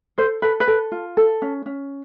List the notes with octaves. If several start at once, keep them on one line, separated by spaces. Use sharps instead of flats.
A4 C5
A4 B4
B4
A4
F4
A4
C#4
C#4